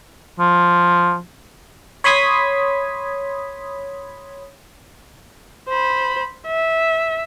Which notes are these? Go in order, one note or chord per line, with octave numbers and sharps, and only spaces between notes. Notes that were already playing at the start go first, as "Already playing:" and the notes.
F3
C#5 B5 C6 D#6 G#6 B6
C5 B5
E5